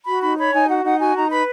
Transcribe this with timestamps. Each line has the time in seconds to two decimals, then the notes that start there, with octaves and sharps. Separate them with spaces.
0.06 F#4 B5
0.22 D#4 B5
0.37 C#5 B5
0.53 D#4 G#5
0.68 F#4 F#5
0.84 D#4 F#5
1.00 F#4 G#5
1.15 D#4 A#5
1.31 B4 B5